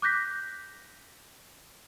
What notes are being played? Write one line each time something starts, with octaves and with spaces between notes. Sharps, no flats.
D6 F#6 G6 A#6 B6